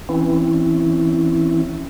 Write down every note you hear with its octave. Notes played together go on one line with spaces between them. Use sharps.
E3 C4 C#4 E4